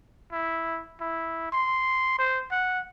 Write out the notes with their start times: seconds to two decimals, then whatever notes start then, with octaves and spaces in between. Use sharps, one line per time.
0.32 E4
1.00 E4
1.52 C6
2.18 C5
2.51 F#5